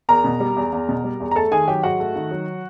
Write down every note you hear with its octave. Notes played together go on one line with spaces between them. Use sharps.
E2 A#4 A#5
B2
G3
E2
E2
B2
G3
E2
A#5
A3 A4 A5
D#3 G#4 G#5
F#3 G4 G5
G#2 F#4 F#5
A3
D#3
F#3